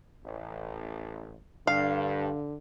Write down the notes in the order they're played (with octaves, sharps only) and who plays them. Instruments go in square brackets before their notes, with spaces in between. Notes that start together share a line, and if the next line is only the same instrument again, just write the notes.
[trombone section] A1
[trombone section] G2 [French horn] D3 [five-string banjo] F5